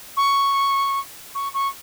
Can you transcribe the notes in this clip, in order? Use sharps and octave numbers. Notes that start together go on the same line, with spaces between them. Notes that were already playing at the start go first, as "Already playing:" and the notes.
C#6
C#6
C#6